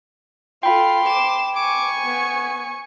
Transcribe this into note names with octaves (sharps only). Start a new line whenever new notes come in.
F4 A4 G5 B5 C6
D6 E7
G#5 C#6 D6
B3